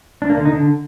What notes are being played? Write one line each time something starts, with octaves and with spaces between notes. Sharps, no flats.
D4
A#3
D3
D#4
D3